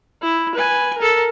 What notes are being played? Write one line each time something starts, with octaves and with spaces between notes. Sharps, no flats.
E4
B4 G#5
A4 A#4